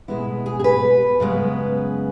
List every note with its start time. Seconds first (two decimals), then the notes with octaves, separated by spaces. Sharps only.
0.08 B2 G#3 B3 E4
0.46 G#4
0.59 G#4
0.64 B4
1.20 F#2 C#3 G#3 B3